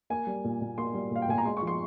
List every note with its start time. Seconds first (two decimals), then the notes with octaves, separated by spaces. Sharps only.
0.10 A#3 G#5
0.27 G3
0.44 A#2
0.61 A#2
0.78 A#3 C6
0.94 G3
1.11 A#2 F5
1.22 G5
1.28 A#2 G#5
1.38 A#5
1.45 G#3 C6
1.57 C#6
1.62 F3
1.67 C6